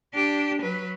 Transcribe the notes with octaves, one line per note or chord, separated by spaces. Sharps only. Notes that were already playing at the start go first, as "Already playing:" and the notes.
D4 G4
F#3 B4